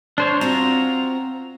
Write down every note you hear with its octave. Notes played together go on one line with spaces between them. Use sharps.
D4 C5 C#5
C4 F4 F#4 A#5